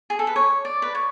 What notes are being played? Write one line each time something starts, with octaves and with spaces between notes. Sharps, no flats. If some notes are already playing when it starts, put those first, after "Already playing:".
G#4
A4
B4
C#5
D5
B4
C#5